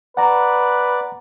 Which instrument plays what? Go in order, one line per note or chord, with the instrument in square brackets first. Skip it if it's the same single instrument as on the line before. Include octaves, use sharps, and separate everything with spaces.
[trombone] B4 [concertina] D5 [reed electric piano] F#5 A#5